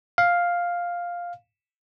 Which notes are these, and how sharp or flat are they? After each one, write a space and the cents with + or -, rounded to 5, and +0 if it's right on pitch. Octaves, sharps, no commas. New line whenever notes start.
F5 +5